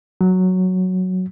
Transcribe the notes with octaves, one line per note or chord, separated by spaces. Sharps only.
F#3